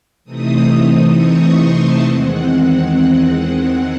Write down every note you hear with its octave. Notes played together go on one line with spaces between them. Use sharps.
C3 E3 A3 C4 D#4 D#6
C#6
C6
A5
E2 D#3 G#3 C4 F#5